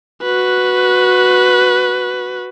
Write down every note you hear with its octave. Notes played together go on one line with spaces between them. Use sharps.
F#4 B4